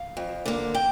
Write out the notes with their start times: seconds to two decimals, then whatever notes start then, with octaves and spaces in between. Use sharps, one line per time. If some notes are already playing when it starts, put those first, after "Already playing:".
Already playing: F5
0.17 F2
0.46 D3 A#3
0.75 G5